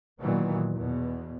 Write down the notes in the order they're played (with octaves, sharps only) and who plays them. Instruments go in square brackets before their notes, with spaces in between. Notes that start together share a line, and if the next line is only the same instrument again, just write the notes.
[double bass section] A#2 D#3 E3 F#3 B3
E2 B2